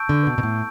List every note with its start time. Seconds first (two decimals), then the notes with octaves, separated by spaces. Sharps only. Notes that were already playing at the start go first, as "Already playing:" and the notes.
Already playing: A5 C#6 E6 G6 D7
0.09 D3
0.27 B2
0.38 B2
0.43 A2